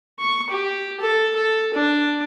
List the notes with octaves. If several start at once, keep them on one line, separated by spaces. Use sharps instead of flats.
C#6
G4
A4
A4
D4